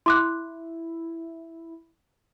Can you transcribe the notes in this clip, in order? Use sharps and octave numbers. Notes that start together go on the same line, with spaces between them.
E4 C6 D6 F#6